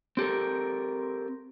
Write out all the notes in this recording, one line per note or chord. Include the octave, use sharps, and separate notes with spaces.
C4 G4 A4 A#4